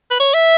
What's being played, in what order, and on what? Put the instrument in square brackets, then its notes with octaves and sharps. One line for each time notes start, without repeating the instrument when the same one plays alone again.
[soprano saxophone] B4
C#5
E5